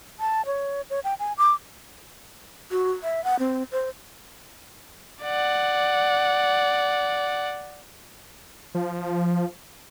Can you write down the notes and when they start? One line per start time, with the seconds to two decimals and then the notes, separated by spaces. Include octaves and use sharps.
0.20 A5
0.46 C#5
0.90 C#5
1.04 G5
1.19 G#5
1.38 D6
2.71 F#4
3.03 E5
3.24 F#5
3.39 C4
3.72 C5
5.23 D5 F#5
8.75 F3